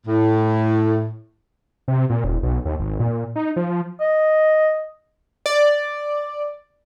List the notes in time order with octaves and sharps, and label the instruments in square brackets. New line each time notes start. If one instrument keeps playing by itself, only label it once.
[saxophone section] A2
[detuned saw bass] C3
A#2
E1
B1
D#2
G#1
A#2
D#4
F3
[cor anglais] D#5
[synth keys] D5